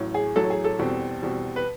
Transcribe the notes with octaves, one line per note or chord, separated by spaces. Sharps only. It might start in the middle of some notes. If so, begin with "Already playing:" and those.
Already playing: A1 A2 F#3
G#4
A1 A2 F#3 A4
G#4
A4
E2 B2 G3 C4
E2 B2 G3 C4
B4